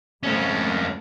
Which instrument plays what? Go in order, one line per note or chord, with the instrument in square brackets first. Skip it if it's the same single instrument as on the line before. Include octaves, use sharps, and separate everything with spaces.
[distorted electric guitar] F2 C#4 [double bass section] C#3 G#3 A3